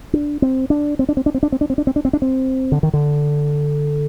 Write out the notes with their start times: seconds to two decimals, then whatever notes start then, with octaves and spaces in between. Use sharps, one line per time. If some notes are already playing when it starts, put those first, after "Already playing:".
0.13 D4
0.42 C4
0.70 D4
0.99 C4
1.09 D4
1.17 C4
1.26 D4
1.34 C4
1.43 D4
1.52 C4
1.61 D4
1.70 C4
1.78 D4
1.87 C4
1.96 D4
2.05 C4
2.13 D4
2.22 C4
2.72 D3
2.83 D#3
2.93 D3